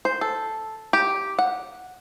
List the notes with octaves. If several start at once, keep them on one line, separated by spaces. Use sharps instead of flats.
C5
A4
G4
F#5